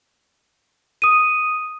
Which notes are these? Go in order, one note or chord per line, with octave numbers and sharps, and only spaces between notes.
D#6 D#7